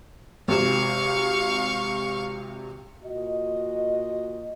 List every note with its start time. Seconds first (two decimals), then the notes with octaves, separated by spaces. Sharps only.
0.48 G#1 C3 F5 C#6 E7
3.04 A#2 F#4 D#5